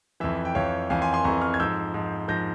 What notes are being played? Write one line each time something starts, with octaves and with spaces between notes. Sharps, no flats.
F2 E3 E5
G5
F2 E3 C#5 F5
F2 E3 F5 G#5
G#5 C6
G#5 C6
F2 E3 A#5 C#6
C#6 F6
G#6
G#2 F3 E6 G6
G#2 F3
G#2 F3 G6 A#6